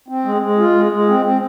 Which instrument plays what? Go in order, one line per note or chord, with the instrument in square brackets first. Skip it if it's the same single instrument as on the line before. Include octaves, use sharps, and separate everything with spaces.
[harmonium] C4
G#3
G#3
F4
G#3
G#3
C4
C4